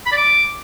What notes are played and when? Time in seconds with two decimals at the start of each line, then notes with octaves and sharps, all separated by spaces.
0.06 B5
0.12 D5
0.17 D6